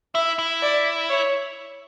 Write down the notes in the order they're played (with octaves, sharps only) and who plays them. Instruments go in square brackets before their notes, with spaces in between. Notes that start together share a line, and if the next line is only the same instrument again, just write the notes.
[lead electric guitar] E4 [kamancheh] E5
[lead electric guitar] E4
[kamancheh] D5
C#5